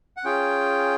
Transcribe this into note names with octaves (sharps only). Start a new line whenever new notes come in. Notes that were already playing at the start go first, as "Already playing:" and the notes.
F#5
C#4 F4 G#4 G5